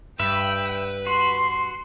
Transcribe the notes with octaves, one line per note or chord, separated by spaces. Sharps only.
G2 B4 E5 G5
F#4 C6